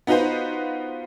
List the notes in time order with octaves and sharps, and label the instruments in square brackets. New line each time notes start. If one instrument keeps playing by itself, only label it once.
[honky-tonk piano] B3 D#4 F4 F#4 B4 C5